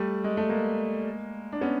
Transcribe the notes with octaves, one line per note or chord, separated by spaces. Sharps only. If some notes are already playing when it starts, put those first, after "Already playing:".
Already playing: G3 A3
G#3
A3
G#3 A#3
D4
B3 C#4